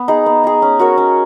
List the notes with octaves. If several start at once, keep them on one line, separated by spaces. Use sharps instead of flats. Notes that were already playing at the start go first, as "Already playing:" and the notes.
Already playing: B3
D#4 G#4
B3
D#4 G#4
C#4
F#4 A#4 C#5
C#4